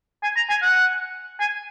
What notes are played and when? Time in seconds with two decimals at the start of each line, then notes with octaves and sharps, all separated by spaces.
0.23 G#5
0.37 A#5
0.50 G#5
0.62 F#5
1.40 G#5